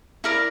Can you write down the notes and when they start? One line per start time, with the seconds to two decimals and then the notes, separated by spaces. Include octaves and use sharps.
0.24 E4 A#4 D5 A#5